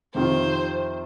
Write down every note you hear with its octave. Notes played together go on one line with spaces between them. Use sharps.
F2 C3 D#3 C4 F4 C5